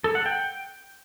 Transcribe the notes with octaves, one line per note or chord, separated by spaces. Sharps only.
A4
F#5
G5